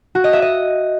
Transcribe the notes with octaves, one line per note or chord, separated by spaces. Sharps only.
F#4
D#5
E5
D#5